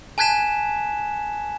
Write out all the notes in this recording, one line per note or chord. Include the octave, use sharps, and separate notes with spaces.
G#5 A5 F#6 G#6 B6 E7